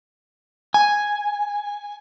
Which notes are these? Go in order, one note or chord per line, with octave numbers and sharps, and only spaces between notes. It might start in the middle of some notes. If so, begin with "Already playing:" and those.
G#5